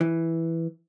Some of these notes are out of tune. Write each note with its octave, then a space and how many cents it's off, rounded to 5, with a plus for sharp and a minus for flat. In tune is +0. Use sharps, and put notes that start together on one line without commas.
E3 +0